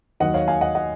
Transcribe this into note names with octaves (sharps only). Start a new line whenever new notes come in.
D#2 D#3 F#3 D#5 F#5
C#5 F5
F5 G#5
D#5 F#5
D#5 F#5